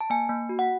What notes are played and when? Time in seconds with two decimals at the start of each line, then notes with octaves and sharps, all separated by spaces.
0.01 A5
0.10 A#3 G#5
0.29 A#3
0.49 F#4
0.59 F#5